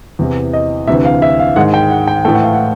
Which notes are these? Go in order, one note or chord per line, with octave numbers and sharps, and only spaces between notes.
E2 C3 E3
D#5
D2 C3 E3 E5
F5
E5
F5
G#2 D#3 G#3 F#5
G5
F#5
G5
A2 E3 A3 G5
F#5
F5
F#5